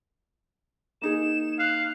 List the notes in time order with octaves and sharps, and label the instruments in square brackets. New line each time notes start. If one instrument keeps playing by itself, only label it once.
[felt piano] A#3 D#4 G#4 [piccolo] E7
[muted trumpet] F5 [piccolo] F#6